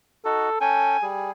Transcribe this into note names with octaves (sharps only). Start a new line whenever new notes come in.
D#4 F#4 A4
C#4 A4 G5 G#5
G3 G#4